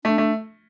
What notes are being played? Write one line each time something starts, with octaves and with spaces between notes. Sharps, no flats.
A3 D4
A3